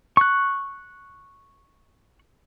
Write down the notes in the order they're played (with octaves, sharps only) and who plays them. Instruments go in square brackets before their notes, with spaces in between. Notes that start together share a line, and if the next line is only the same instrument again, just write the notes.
[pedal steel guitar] C#6 F#6